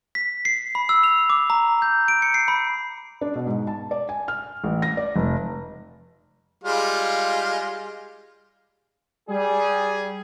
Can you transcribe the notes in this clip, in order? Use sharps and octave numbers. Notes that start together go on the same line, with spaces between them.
B6
C7
B5
E6
F7
D6
A#5
G6
D7
C#7
C7
B5
D4
B2
G#2
A5
D5
G#5
F6
A1
A#6
D5
F1
G3 G#3 F4
G3 G#4